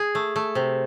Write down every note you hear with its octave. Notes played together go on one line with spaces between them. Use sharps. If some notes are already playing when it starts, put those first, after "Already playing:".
Already playing: G#4
A3
A3
C3